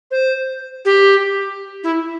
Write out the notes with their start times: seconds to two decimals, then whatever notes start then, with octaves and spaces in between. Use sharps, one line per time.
0.11 C5
0.85 G4
1.84 E4